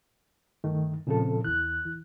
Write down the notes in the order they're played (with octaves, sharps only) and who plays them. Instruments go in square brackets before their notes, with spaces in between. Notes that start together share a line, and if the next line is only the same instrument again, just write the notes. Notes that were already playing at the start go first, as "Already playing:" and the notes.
[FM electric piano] G2 [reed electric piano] D#3 A3
[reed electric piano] A#2 F3 A4 [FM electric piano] C#3 C4
[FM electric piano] E2 E3 [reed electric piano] F#6
[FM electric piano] E3